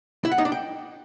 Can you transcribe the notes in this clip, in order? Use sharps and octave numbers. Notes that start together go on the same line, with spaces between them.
E4
F#5
D#4
D4
G5